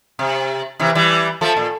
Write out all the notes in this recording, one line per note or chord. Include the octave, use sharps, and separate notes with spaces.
C3
C3 E3
E3 G3
F3 A3
A#2